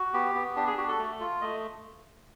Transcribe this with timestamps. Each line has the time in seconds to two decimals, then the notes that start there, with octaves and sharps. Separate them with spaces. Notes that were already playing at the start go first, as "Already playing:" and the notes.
Already playing: F#4
0.13 B3 G4
0.35 B3
0.56 D4 G4
0.67 G#4
0.77 F#4 G4
0.88 A4
0.98 A3
1.20 F4
1.41 A3 D#5